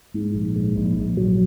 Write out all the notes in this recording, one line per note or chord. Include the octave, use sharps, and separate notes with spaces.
G#2
A#1
G#2
A#1
A#1
F#3